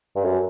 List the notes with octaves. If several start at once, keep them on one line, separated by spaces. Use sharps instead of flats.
G2
F#2